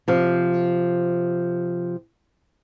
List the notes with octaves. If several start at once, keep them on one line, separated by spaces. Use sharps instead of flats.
C3 F3